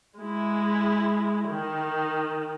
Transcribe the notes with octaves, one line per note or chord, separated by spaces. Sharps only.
G#3 E4
D#3